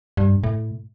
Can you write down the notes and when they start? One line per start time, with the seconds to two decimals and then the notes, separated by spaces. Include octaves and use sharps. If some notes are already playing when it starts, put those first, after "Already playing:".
0.17 G2
0.44 A2